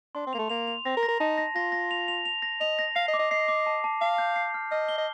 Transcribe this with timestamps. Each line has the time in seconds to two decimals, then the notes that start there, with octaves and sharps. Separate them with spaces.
0.15 D4 C6
0.26 C4
0.33 A#3 F7
0.38 A3
0.50 A#3 F7
0.67 F7
0.85 C4 A#6
0.97 A#4
1.03 A#6
1.08 A#4
1.20 D#4 A5
1.38 A#6
1.55 F4 A#6
1.72 A#6
1.91 F7
2.08 F7
2.26 F7
2.42 A#6
2.60 D#5 F7
2.79 A#6
2.95 F5 C7
3.08 D#5
3.14 D6
3.19 D#5
3.31 D#5 C7
3.48 D6
3.66 A5
3.84 A5
4.01 F5 A5
4.18 G6
4.36 C7
4.54 F6
4.71 D#5 F6
4.89 G7
4.98 D#5